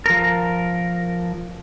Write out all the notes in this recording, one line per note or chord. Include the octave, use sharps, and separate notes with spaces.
F3 A#4